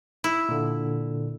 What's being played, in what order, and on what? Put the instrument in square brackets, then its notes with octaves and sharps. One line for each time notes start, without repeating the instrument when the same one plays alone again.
[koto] E4
[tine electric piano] A#2 D3